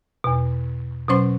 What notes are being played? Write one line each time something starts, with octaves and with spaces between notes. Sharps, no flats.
E2 B2
B2 F#3 C#4 C5 C6